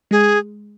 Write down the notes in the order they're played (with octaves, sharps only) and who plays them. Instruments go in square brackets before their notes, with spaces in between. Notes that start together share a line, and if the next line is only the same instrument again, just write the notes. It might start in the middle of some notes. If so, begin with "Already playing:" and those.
[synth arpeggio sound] G#3 [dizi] G#4